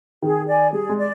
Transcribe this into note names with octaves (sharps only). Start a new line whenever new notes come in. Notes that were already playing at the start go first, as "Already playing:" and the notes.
D#3 G#4
D5 G#5
G3 G#4
G#3
D5